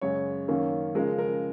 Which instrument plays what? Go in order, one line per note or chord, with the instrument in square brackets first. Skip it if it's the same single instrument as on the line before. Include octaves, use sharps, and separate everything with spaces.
[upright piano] F#2 C#3 G#3 C#5
F#2 D#3 A#3 C#4
C#3 F3 G#3 A#4
A#4